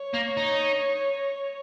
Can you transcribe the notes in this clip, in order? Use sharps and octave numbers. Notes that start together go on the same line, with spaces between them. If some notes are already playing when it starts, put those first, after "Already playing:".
Already playing: C#5
A#3
D#4